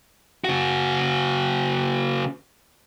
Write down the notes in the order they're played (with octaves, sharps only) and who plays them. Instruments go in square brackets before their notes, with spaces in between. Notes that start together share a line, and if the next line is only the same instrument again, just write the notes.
[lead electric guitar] C#3 F#4